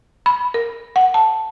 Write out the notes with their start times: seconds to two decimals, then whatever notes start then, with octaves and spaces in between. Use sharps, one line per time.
0.26 B5
0.54 A#4
0.96 F#5
1.14 A5